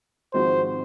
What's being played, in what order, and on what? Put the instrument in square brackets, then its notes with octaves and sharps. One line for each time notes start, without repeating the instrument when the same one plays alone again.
[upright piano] G#1 G#2 F3 C4 F#4 [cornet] C5